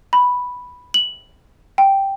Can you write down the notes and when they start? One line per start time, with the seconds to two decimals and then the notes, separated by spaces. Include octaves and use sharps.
0.13 B5
0.94 F#7
1.78 G5